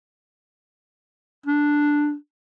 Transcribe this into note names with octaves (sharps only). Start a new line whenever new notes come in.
D4